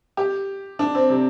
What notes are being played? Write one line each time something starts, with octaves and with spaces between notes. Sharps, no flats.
G4
D4
C4
C3